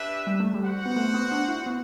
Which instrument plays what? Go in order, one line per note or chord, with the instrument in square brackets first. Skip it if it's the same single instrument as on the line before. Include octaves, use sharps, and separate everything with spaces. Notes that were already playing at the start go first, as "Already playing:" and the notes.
Already playing: [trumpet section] D4 G4 B4 E5
[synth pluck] G3
A3
G3
[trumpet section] F#4 C5 F#5
[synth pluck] B3
A3
B3
D4
E4
B3